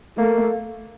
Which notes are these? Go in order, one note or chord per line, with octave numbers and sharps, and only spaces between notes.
A3 A#3